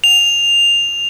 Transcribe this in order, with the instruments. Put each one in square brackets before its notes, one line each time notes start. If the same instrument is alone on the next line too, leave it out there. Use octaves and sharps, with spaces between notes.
[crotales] F7